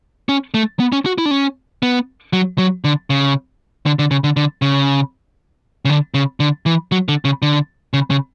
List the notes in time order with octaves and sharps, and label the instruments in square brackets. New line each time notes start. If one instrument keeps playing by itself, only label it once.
[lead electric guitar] C#4
A3
B3
C#4
F#4
E4
D4
C#4
B3
F#3
F#3
D3
C#3
D3
D3
C#3
D3
D3
C#3
C#3
D3
C#3
D3
E3
F#3
D3
C#3
D3
C#3
C#3